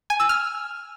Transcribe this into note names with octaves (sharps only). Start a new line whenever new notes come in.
G#5
E6
F6